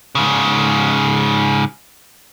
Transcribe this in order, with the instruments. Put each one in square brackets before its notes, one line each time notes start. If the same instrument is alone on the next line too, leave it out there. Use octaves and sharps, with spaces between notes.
[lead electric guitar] G#2 C#3